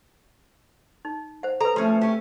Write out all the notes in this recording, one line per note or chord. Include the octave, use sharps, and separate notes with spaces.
D#4
C5 F#5
A4 B4 A#5
F3 A3 C#4
C#4 G4